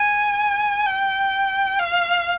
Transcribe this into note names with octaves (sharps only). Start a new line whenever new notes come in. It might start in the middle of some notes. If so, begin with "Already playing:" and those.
Already playing: G#5
G5
F5